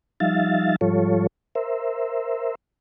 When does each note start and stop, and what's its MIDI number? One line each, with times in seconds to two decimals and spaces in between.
0.20 0.76 53
0.20 0.76 55
0.20 0.76 63
0.20 0.76 76
0.20 0.76 77
0.20 0.76 93
0.81 1.27 44
0.81 1.27 53
0.81 1.27 55
0.81 1.27 65
0.81 1.27 69
0.81 1.27 73
1.55 2.55 70
1.55 2.55 72
1.55 2.55 76